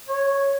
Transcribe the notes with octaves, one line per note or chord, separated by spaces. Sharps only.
C#5